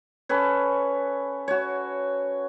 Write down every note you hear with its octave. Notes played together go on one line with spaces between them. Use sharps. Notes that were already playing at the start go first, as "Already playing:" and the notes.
C#4 A4 B4 C#5
F#4 C#5